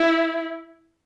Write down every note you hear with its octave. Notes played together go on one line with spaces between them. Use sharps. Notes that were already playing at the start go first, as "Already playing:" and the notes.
Already playing: E4